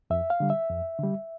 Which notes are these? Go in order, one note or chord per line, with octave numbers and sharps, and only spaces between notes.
F2 E5
F5
D3 G3
E5
F2
D3 G3